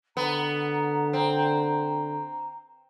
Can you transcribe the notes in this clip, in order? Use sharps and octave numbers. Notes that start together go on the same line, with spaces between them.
D3 B3 A#5
C4